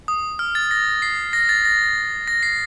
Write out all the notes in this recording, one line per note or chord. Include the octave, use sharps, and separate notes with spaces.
D#6
F6
A6
A#6
C7
A#6
A6
A#6
A#6
C7